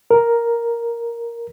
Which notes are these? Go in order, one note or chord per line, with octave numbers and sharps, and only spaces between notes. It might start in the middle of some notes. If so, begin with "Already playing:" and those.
A#4